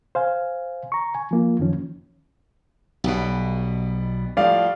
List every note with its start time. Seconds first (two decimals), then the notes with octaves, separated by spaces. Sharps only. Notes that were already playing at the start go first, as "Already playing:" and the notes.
0.15 C5 F5 G#5
0.92 A#5 C#6
1.15 G#5
1.31 F3 A#3 F4
1.59 F#2 D#3 F3 C#4
3.04 B1 B2 G3 B3
4.37 A2 F3 G3 D5 F5